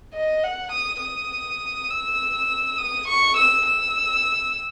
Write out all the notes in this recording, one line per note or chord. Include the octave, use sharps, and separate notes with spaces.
D#5
F#5
D#6
D#6
E6
D#6
C#6
E6
E6